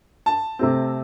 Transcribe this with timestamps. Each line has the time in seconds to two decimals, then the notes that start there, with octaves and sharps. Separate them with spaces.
0.26 A5
0.59 C3 A3 C4